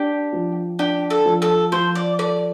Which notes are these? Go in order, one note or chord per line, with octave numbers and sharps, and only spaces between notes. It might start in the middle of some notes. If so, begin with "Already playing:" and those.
Already playing: D4 G4
F3
D4 G4
A4
F3
A4
F3 C5
D5
A4 D5